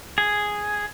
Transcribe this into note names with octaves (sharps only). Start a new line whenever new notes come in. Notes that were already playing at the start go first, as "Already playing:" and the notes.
G#4